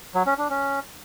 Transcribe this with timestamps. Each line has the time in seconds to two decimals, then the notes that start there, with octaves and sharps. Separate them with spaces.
0.15 F#3
0.26 C#4
0.38 D4
0.50 C#4